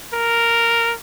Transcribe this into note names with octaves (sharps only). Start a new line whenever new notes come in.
A#4